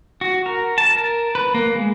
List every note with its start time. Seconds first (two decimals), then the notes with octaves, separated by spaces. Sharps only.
0.21 F#4
0.46 A#4
0.78 A5
0.96 A#4
1.35 B4
1.54 A#3
1.76 G#3